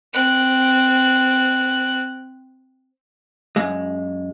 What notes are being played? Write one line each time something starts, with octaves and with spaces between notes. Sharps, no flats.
C4 F#6
F#2 G#3